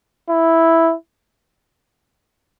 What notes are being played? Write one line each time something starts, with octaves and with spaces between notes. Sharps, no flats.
E4